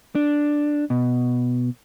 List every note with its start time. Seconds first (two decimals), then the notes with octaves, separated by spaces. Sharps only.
0.15 D4
0.90 B2